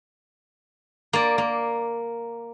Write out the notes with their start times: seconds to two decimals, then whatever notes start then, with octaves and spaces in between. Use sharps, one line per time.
1.13 A#3 D5
1.38 A#3